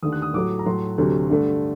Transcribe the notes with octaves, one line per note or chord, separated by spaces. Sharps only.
D#2 D3 A3 D#6
F#6
D#6
A2 F#3 A3 D6
A#5
A2 F#3 A3 C6
D2 C3 F#3 A3
G2 D3 A3